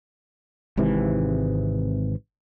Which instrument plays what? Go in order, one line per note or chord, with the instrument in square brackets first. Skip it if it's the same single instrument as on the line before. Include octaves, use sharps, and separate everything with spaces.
[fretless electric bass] G#1 G#2 C3 E3